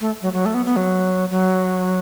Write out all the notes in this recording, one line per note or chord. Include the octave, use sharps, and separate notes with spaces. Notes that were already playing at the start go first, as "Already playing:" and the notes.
A3
F#3
F#3
A3
B3
B3
F#3
F#3